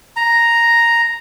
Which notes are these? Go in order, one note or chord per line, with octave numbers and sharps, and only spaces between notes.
A#5